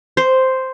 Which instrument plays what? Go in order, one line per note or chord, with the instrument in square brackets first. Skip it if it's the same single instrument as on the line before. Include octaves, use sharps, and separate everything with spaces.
[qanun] C5